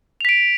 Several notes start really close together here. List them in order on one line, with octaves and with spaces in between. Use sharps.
F7 B6 D7